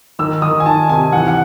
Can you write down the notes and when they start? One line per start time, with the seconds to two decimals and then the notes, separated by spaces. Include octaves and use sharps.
0.19 D#3 E6
0.42 D#3 D#6
0.60 G#5
0.66 D#3 A5
0.89 C3 G#5
1.13 E3 F#5
1.28 F#5